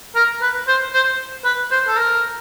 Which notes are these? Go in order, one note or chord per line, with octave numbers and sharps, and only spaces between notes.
A#4
B4
C5
C5
B4
C5
A4
A#4